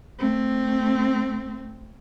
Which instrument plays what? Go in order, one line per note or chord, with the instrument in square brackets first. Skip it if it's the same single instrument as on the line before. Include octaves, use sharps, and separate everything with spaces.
[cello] A3 C4